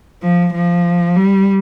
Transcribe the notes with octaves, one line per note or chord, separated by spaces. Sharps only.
F3
F3
G3